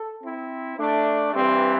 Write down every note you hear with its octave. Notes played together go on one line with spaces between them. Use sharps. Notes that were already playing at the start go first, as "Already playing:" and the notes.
Already playing: A4
C4 E4
A3 D4
G2 E3 G3 C4